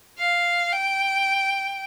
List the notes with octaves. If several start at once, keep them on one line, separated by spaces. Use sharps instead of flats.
F5
G5